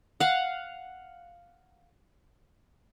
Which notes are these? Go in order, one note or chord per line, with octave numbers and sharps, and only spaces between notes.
F5 F#5